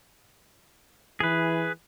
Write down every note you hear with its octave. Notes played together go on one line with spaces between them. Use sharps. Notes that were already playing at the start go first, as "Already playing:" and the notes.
E3 G#4 B4